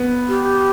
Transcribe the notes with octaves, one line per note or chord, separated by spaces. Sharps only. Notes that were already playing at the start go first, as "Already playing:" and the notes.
Already playing: B3
G4